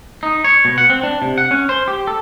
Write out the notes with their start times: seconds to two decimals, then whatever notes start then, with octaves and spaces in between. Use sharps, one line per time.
0.23 D#4
0.44 C#5
0.65 B2
0.78 F#5
0.90 C4
1.03 D4
1.22 C3
1.38 F#5
1.51 C#4
1.69 C5
1.88 G4
2.07 A4